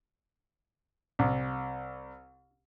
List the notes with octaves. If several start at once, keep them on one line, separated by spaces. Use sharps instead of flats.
C2